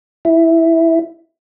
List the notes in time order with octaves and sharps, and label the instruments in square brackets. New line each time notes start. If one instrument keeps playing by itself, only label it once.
[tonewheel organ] E4